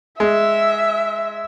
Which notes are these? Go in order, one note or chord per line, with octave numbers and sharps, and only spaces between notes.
G#3 E5